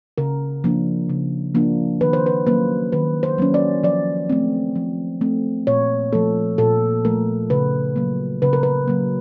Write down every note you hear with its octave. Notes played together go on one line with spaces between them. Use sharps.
C#3 A#4
F3 A#3 D4
C#3
F3 A#3 D4
D#3 B4
C5
B4
F#3 A#3 C#4 B4
D#3 B4
C5
F#3 A#3 C#4
D5
F3 D5
A3 C4
F3
A3 C4
A#2 C#5
F3 A3 A4
A#2 A4
F3 A3 A#4
C#3 B4
F#3 A#3
C#3 B4
A#4
B4
F#3 A#3